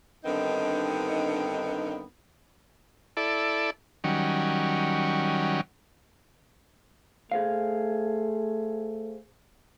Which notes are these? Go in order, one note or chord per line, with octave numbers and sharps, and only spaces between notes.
G2 D3 D#3 B3 C4 D#4
E4 A4 D5
D#3 F#3 G3 C#4
A3 G#4 C5 F5